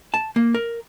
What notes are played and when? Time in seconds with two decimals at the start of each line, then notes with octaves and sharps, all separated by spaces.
0.14 A5
0.36 A#3
0.55 A#4